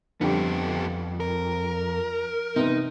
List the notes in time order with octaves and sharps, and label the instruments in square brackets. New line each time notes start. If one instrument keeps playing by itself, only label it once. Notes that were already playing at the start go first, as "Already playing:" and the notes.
[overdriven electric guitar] F2 [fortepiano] D3 G3 [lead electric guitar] B3 G4
[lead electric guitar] A#4
[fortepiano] C3 B3 [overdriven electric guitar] D#4